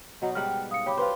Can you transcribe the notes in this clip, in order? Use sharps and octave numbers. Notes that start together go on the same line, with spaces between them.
B2 F#3 D#4 D#5
G#2 G3 F#5 G5 F6
F5 D#6 C#7
G4 C#5 B5 D6
F4 G4 B4 C5